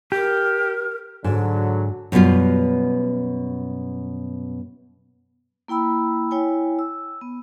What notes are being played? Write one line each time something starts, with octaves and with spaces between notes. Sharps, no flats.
G4 A#4
G#2 D3 F#3
F#2 B2 G3 B3 F4
A#3 E4 G5 B5 E6
E4 C#5 G5 G#5
E6
B3